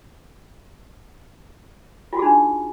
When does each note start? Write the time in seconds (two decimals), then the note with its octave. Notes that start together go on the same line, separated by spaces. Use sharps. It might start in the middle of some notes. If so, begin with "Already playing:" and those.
2.13 F4
2.16 F#4
2.19 G#4
2.22 D#4
2.25 D4